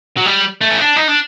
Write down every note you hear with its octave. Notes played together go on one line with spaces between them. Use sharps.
F#3
G3
A3
C#4
D4
D#4
D4